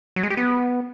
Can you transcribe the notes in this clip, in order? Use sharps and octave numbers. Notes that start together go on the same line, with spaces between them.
F#3
G#3
G4
B3